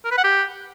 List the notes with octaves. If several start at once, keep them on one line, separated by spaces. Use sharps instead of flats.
A#4
B4
F#5
G4